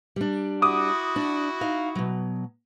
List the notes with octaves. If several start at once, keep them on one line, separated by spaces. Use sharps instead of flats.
G3 D4
E4 F#4 D6 D#6
D4
D#4 F5
B2 F#3